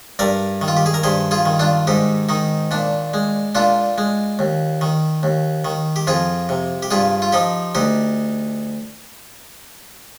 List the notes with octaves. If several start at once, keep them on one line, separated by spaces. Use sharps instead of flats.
G2 A#4 D5
D#3
F4
G4
G#4
A#4
G2 G#4 C5
F4 G#4
D#3
D4 F4
G#2 D#4 G4
D#3 D#4
A#2 D4
G#3
A#2 D4 F4
G#3
D#2
D#3
D#2
D#3
G4
F2 F4 G#4
C3
G4
G2 F4 G#4
F4
F3 D#4 G4
D2 D#4 G4